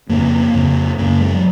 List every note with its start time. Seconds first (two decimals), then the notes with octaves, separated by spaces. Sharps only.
0.09 F2 C#3 A#3
0.54 F2 C#3
0.98 F#2 C#3 A#3
1.20 G#3
1.33 F#3